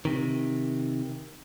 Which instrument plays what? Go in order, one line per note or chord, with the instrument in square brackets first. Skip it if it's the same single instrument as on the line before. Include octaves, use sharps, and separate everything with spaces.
[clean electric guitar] C3 D#3